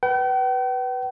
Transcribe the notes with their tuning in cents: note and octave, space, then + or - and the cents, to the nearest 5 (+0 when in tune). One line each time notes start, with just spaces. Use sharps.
B4 -5 G5 -45